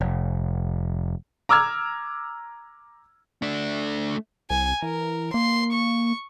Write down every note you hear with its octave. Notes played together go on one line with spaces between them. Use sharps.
F1
A#5 D6 E6 F6 G#6
A3 D4
C2 G#5
E3 A#4
A#3 C6
C#6